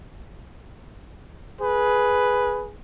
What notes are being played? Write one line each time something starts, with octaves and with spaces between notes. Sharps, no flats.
G#4 B4